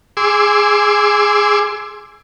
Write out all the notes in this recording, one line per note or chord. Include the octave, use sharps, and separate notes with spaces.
G#4 C6 D6 E6